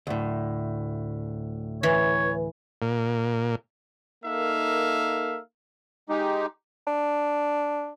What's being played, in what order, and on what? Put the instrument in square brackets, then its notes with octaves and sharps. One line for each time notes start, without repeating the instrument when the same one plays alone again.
[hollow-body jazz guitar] D2 A2
[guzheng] E3 [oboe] C#5
[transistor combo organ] A#2
[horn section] A#3 D#4 A4 A#4 E5 F5
[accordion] G#3 D#4 G4
[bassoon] D4